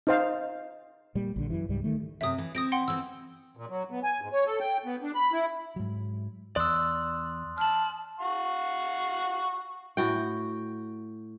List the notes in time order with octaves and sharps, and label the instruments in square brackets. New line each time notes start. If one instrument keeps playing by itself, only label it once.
[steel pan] D#4 C5 F5
[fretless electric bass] A#2 G3
A#1 D3
F#2 E3
C#2 G#2 G3
D#3 A3
[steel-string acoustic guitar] F#2 C3 [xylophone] E5 D#6
[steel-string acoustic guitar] E3
[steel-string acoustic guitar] C4 E4 [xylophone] D#6 A#6 D7
[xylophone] F#5 G5 C6
[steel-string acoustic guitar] E3 C4 [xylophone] E6
[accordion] A#2
F#3
B3
G#5
G#2
C#5
A4
G5
B3
D4
B5
E4
[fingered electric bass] G#2 F#3
[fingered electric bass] E2 [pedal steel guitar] D5 E6 [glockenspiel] C6 D#6 F#6
[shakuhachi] A5 [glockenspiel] F6 F#7
[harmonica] F5 F#5 C#6
[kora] A2 F#4 G5